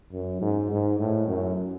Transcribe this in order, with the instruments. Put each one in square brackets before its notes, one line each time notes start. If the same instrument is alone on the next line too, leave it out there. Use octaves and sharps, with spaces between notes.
[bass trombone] F#2
G#2
G#2
A2
F#2